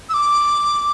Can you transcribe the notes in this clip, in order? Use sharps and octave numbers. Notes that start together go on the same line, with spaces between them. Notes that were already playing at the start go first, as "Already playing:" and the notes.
E6
D6